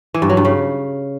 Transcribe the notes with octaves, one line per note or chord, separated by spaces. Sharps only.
E3
G2
F#3
G2
C#3